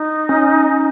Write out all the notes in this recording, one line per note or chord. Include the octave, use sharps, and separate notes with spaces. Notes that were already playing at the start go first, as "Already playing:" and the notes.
Already playing: D#4
C#4